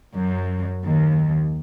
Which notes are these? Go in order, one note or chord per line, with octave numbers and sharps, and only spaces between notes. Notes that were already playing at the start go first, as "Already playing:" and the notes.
F#2
D#2